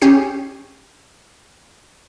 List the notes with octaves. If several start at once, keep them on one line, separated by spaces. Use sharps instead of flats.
C#4 G4 G#4 C7